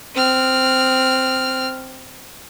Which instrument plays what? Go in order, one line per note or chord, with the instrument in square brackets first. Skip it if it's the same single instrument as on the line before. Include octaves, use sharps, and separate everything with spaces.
[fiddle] C4 F6